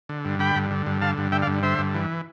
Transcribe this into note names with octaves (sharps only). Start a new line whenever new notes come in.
D3
G2
D3 G5 B5
G2
D3
G2
D3 F5 A5
G2
D3 E5 G5
D5 F5
G2
D3 C5 E5
G2
E3